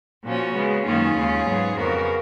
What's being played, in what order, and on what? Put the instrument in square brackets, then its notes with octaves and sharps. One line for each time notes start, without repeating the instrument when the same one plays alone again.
[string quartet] A#2 F3 A#3 C#4 F#4
C#3 G#3 B3
F#2 D#3 A#3 C#4 F4 G#4
D#2 C#3 G#3 C#4
G#2 F#3 B3
F2 C#3 F3 B3 F#4 A#4